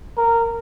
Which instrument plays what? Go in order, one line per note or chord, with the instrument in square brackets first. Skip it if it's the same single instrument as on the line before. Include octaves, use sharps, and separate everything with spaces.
[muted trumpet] A#4